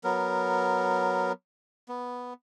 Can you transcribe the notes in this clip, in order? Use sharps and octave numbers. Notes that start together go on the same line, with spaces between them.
F#3 B3 A#4
B3